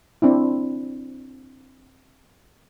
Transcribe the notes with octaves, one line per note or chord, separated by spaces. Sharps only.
C4 D4 E4